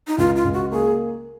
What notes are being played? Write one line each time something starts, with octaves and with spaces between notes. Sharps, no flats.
D#4
C#2 F4
F4
C#2
F#4
A#3 G#4